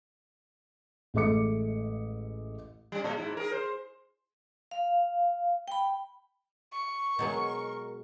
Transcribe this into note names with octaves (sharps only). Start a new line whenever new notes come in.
A1 G#3 A3 D#5 D6 C#7
G3 C#4
A#2 G#3
G#2 E4
G#4 A#4
C5
F5
G5 B5
C#6
B2 F#3 G#3 A#4